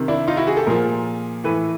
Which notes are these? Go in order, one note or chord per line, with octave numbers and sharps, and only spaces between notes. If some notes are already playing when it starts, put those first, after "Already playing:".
Already playing: C3 D#3
D4 E4
D#4 F4
E4 F#4
F#4 G#4
G4 A4
A#2 F3 G#4 A#4
A2 E3 A4 B4